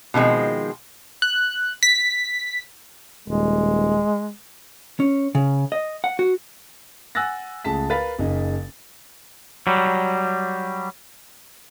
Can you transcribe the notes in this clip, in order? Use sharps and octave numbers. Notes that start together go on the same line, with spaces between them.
B2 D#3 F3 G#3 C4
F#6
B6
D#1 G#3
C#4
C#3
D#5
F#5
F#4
F#5 G#5 E6 F#6 A6 A#6
C#2 A3 G#4 A5 B6
A#4 B4 F5 A6 B6
F#1 C#3 D#4
F#3 G3